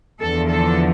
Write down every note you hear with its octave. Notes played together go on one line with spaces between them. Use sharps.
E2 D3 F3 A4
A4